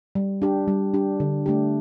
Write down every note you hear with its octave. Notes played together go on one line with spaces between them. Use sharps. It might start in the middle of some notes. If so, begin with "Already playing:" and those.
G3
D4 G4
G3
D4 G4
D3
A3 D4 G4